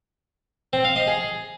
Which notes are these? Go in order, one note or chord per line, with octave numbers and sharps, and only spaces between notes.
C4
F5
D#5
G#4